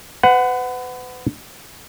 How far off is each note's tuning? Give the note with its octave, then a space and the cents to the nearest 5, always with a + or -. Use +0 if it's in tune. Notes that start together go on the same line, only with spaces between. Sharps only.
B4 +35 F#5 +0